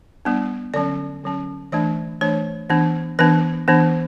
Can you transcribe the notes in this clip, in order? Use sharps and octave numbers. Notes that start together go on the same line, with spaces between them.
G3 B3 D4
D3 F#3 C#4 D5
D3 F#3 C#4
E3 A3 D4 D5
E3 A3 D4 C#5
E3 B3 D4
E3 B3 D4 B4
E3 B3 D4